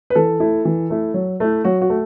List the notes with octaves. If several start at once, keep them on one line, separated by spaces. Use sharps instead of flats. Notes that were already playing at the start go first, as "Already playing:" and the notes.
B4
E3 A4
A3 E4
E3
A3 E4
F#3
A3 E4
F#3 F#4
F#4
A3